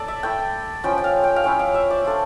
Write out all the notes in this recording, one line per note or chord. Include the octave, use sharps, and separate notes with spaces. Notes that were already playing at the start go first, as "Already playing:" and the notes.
Already playing: A4 D5
E5
A3 E4 G5
F3 C#4 E4 G5
G5
F5
G5
F5
F3 C#4 E4 G5
F5
E5
D5
A3 D4 F4